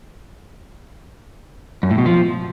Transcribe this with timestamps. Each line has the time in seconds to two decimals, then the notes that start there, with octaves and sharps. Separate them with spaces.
1.83 F#2
1.91 A2
1.98 B2
2.06 F3